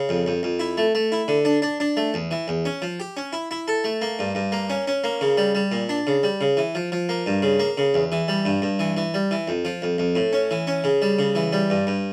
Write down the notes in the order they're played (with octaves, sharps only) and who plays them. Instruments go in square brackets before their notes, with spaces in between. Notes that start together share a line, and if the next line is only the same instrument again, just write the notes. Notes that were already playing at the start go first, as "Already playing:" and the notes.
Already playing: [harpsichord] C#3
F2
F2
F2
E4
A3
A3
E4
D3
D4
D4
D4
A3
E2
E3
E2
C#4
F3
G4
C#4
E4
E4
A4
A3
A#3
G2
G2
A#3
C#4
C#4
A#3
C#3
G3
G3
A#2
D4
C#3
G3
C#3
E3
F3
F3
A#3
G2
C#3
A#3
C#3
E2
E3
G3
G2
G2
E3
E3
G3
E3
F2
F3
F2
F2
A2
C#4
E3
C#4
C#3
G3
C#3
E3
G3
G2
G2